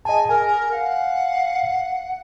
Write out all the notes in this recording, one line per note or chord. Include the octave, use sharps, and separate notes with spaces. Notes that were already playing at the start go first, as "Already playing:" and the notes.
G#4 D#5 G#5 A5
A#4 G#5
F5 F#5